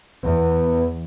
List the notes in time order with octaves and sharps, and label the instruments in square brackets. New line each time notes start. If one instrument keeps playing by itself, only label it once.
[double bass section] E2 [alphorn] B3